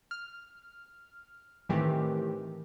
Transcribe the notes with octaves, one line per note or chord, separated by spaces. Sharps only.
F6
A2 D#3 E3 A3 C4 G4